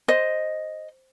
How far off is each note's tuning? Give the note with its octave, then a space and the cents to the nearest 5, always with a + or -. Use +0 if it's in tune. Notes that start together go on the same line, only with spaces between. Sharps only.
C5 +0 D#5 +0